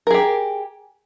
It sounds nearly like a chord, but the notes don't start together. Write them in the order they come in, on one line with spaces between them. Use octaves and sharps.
A#4 G#4 G4